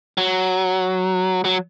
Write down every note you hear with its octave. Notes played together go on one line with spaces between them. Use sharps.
F#3
F#3